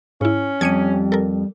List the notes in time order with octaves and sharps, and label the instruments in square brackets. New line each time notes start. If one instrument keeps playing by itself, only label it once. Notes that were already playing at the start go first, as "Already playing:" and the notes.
[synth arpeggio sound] G#2 E4 [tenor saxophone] C#4
[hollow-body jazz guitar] F2 [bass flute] G3 [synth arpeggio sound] G#6 C#7 D#7
[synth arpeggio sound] A4 A#4